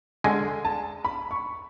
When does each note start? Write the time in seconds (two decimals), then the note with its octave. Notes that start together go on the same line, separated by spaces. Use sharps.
0.24 D3 G#3 C#4 G#5
0.65 A5
1.05 B5
1.31 C#6